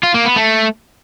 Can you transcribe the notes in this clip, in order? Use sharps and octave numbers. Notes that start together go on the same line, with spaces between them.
F4
A#3
B3
A3